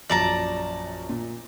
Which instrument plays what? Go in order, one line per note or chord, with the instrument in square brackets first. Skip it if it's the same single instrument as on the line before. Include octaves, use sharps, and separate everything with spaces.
[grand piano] A#1 F#2 [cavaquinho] D5 A5 A#5
[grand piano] A#2